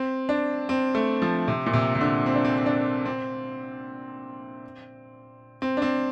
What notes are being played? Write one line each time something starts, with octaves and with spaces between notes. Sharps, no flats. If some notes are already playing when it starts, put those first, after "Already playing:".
Already playing: C4
D4
C4
A3
F3
C3
A#2
C3
C3
D3
C4
D4
C4
C4
D4
C4
C4
D4
C4